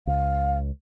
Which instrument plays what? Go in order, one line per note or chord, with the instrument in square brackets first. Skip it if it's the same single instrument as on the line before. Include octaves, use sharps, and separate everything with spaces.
[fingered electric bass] C#2 [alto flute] F5